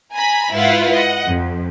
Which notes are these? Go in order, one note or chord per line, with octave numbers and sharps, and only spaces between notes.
G#5 A#5 B5
G#2 E4 F4 B4 F5 F#5
D#5 F#5
F2